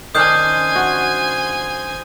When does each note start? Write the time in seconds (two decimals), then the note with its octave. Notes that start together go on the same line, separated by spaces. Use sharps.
0.15 D#3 C#4 D4 C5 G#5 D#6 G6 C7
0.76 F#4